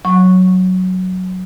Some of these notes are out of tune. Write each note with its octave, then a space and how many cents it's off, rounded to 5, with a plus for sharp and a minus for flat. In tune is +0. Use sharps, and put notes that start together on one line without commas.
F#3 +0 C#6 -5